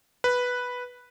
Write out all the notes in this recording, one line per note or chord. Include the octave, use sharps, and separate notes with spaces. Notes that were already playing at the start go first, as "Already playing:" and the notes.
B4